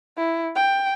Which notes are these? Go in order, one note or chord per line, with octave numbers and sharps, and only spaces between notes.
E4
G5